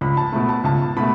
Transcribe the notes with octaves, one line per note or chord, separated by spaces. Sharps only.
C#2 B5
A5
B2 A3 B5
A5
C#2 A5
B2 A3 B5